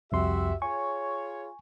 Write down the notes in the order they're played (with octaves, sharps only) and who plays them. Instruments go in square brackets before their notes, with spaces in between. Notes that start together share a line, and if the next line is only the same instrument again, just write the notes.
[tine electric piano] C2 F2 C6 [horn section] F#4 G4 E5
[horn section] F4 G#4 C#5 [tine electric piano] G#5 C#6